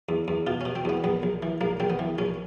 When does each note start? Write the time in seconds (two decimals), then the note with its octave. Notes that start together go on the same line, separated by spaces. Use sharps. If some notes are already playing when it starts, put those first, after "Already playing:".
0.09 E2
0.28 E2
0.47 B2 F4
0.61 C#4
0.65 B2
0.76 C4
0.85 E2 B3
1.04 A#1 B3
1.23 A#1
1.43 E3
1.61 A#1 A#3
1.80 A#1 C4
1.90 B3
1.99 E3
2.18 A#1 C#4